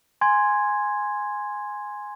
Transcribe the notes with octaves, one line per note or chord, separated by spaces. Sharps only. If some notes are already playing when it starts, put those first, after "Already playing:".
G#5 C6 G#6